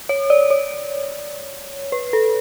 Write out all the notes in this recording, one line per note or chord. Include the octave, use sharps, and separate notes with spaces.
C#5
D5
C#5
B4
A4